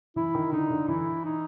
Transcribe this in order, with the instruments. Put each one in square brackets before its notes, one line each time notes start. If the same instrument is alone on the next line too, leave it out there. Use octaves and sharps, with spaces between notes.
[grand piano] E3 [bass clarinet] E4
[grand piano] D#3
[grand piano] D3 [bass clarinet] D#4
[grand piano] D3
[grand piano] E3 [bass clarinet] E4
[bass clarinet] D#4